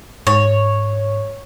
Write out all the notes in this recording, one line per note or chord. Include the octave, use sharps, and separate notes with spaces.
G#2 C#5